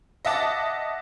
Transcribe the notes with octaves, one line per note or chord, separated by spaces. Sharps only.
D#5 E5 F#5 A5 D6